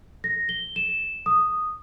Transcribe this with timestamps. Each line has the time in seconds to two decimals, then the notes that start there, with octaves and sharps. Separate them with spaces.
0.24 A#6
0.49 G7
0.76 E7
1.26 D#6